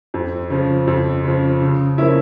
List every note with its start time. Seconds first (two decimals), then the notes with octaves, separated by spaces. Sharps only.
0.14 F2
0.50 C#3 F3
0.87 F2
1.24 C#3 F3
1.61 C#3
1.98 F3 A#3 C#4 E4